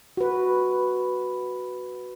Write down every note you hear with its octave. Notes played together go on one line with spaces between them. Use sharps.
F#4 B4